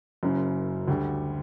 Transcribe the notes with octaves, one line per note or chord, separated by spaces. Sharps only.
F#1 F#2 C#3
D2 D3 G3